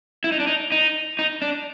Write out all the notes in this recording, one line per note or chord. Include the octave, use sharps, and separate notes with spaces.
E4
D#4
D4
D#4
D#4
D#4
D4